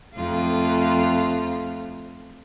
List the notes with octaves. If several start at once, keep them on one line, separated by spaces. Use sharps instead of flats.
F2 A3 F4